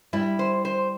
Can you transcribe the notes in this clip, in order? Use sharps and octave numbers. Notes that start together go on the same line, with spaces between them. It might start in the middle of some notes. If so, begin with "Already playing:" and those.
G3 E4
C5
C5